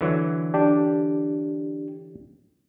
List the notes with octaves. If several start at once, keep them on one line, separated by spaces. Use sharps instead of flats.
D3 E3 F#3
D4 G4